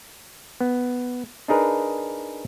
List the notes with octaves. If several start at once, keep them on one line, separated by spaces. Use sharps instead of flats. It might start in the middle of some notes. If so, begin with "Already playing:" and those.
B3
D4 D#4 G#4 A#4 B4